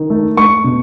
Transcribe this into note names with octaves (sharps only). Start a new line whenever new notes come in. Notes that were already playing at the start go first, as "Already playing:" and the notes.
Already playing: D#3
A3
A3 C#6
B2